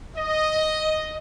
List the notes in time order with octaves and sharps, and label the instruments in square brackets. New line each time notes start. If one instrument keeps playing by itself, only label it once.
[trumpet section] D#5